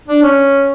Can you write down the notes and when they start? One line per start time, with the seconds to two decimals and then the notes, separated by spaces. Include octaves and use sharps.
0.08 D4
0.22 C#4